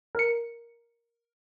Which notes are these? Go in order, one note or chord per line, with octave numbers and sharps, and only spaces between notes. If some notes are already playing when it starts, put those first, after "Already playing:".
A#4 C#7